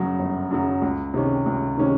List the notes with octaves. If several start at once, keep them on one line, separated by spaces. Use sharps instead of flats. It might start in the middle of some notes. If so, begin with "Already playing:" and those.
Already playing: G1 F#2 C#3 F#3
G1
F#2 C#3 F#3
C#2
C3 D#3 G#3 C#4
C#2
C3 D#3 G#3 C#4